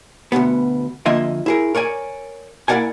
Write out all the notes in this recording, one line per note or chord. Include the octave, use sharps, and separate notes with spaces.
D2 G#2 B2 B3
F2 D3 A#3 F4 D#5 E5
E4 G#4 A#4
A#4 C#5 D5 G#5
A#3 E4 A#4 D5 F#5 G#5